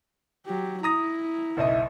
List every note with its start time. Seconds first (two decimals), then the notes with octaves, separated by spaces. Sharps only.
0.46 F#3 G4
0.83 E4 A#5 D#6 A#6
1.57 F#1 B1 D#5 E5